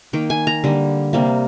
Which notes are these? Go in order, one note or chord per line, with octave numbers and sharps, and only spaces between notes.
D#3 A#3 G5
G#5
A#5
D3 G3 A#3
C3 G3 A#3